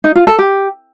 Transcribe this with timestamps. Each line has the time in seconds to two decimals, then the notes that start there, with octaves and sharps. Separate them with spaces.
0.04 D#4
0.15 F4
0.27 A4
0.38 G4